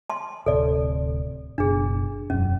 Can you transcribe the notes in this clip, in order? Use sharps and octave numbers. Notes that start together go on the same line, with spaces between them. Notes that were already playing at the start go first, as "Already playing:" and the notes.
A5 C6
D1 C3 A4 D5
F#1 B2 D4 G#4
E1 F#2 C#4